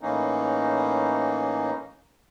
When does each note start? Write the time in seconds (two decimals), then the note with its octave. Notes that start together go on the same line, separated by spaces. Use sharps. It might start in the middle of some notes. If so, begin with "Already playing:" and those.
0.01 A2 E3 A#3 C#4 D#4